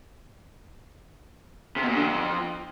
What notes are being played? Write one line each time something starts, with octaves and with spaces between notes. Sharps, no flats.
C3
B2
A#2
D3
F2